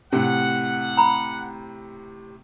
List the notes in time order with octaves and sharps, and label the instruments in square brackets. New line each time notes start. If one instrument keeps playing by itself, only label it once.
[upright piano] A2 C3 [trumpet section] F#5
[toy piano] A#5 B5